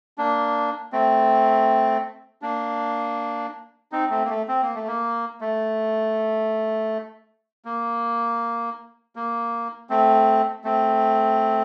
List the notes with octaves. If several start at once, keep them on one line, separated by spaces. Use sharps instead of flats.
A#3 D4
A3 C4
A#3 D4
C4 D#4
A3 C4
A#3
A3
C4
A#3
A3
A#3
A3
A#3
A#3
A3 C4
A3 C4